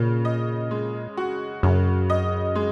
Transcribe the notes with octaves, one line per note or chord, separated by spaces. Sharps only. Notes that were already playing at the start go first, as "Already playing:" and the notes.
Already playing: A#2 C#3
D#5
G#3
F#4
F#2 C#3
D#5
G#3